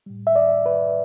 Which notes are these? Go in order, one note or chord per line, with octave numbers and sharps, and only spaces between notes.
A2 G3
E5
D5
B4